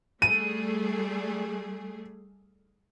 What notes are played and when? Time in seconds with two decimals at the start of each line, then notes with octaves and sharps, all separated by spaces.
0.22 G3 A3 G#4 D#7